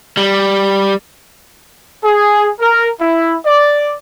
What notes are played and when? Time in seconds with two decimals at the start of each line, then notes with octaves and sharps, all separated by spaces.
0.17 G3
2.04 G#4
2.60 A#4
3.01 E4
3.45 D5